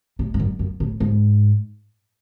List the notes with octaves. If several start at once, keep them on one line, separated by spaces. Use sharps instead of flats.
A2
G#2
F#2
F#2
A2
G#2